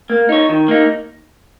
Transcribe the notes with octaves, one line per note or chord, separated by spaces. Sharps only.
A#3
D#4 C#5
D#3
A#3 D#4